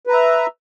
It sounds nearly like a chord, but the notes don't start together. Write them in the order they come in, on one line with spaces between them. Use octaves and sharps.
B4 A#5 E5